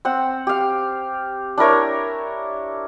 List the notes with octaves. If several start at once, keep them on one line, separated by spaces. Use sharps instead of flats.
C4 F#5
G4 F5
D4 E4 A#4 C#5